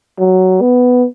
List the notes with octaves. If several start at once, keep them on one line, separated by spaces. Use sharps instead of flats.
F#3
B3